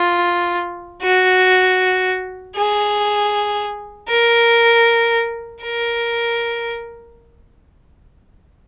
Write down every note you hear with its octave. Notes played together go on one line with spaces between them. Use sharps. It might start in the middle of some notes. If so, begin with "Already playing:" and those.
Already playing: F4
F#4
G#4
A#4
A#4